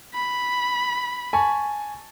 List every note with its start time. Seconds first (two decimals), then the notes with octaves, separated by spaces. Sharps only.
0.14 B5
1.33 G#5 A5 C#6